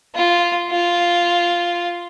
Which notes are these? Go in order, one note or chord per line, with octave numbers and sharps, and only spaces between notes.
F4
F4